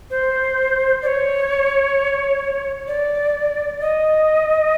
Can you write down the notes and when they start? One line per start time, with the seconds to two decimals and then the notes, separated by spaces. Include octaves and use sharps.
0.10 C5
1.02 D5
1.07 C#5
2.87 D5
3.80 D#5